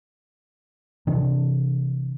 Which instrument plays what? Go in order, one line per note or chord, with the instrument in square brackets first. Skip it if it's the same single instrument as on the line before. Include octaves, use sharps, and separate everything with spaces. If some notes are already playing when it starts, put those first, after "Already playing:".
[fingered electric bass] C3 E3 D4